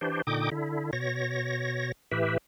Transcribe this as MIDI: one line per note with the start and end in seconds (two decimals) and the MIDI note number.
0.01 0.22 52
0.01 0.22 62
0.01 0.22 67
0.01 0.22 72
0.27 0.50 46
0.27 0.50 50
0.27 0.50 63
0.27 0.50 79
0.27 0.50 86
0.27 0.50 87
0.52 0.91 50
0.52 0.91 64
0.93 1.92 47
0.93 1.92 73
0.93 1.92 94
2.11 2.37 45
2.11 2.37 52
2.11 2.37 67
2.11 2.37 71
2.11 2.37 76